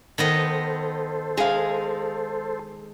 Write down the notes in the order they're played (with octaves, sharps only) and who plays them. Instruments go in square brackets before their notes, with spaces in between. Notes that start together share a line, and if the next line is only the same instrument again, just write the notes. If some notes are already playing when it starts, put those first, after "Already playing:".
[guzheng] D#3 B3 D#5 [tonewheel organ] A4 C5
[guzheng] G#3 [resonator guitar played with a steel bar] G#4 F5